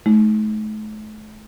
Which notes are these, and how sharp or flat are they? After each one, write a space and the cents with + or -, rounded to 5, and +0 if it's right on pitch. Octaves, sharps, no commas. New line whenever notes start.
A3 -40 D#4 +40